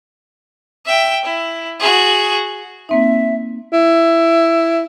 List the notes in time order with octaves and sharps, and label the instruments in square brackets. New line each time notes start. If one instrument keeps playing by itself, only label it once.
[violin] E5 G5
E4
F#4 G#4
[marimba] A#3 C4 D#4 [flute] E5
[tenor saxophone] E4